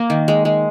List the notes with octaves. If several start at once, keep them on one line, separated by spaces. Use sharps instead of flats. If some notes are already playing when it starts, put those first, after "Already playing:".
Already playing: A#3
D#3
G#3
G#3